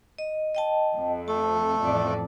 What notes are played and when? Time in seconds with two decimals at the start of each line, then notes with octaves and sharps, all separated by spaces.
0.18 D#5
0.55 D#5 G5 A5
0.96 F2
1.28 A3 A4 A5
1.82 A1 F2 D5